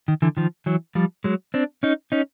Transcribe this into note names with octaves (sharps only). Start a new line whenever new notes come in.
D#3
D3 E3
D#3 F3
E3 F#3
F3 G3
F#3 G#3
C4 D4
C#4 D#4
C#4 D#4